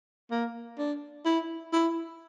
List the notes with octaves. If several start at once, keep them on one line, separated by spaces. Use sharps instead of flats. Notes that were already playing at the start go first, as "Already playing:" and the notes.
A#3
D4
E4
E4